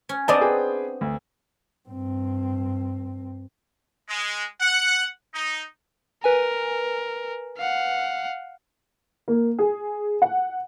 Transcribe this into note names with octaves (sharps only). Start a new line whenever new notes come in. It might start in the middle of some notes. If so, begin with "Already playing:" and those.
C#4
B3 C4 D4 D5 D#5 A5
G#4 B4 G5
D2
G2 C4
G#3
F#5
D#4
A#4 B4 G#5
F5 F#5
A#3
G#4
F#5